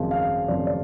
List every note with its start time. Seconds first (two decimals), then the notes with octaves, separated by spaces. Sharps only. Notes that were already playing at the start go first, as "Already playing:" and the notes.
Already playing: G#1 F#2 C#3 F3
0.11 F5
0.48 G#1 F#2 C#3 F3 D5
0.67 D5